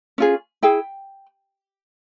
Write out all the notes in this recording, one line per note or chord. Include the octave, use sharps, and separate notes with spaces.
C#4 F4 G#4
E4 G#4 G5